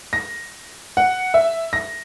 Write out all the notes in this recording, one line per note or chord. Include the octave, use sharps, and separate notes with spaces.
A#6
F#5
E5
A#6